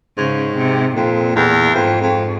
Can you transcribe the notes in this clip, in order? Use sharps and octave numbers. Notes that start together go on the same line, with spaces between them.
G#2 C#3
C3
F2 A#2
E2
F2 G#2
F2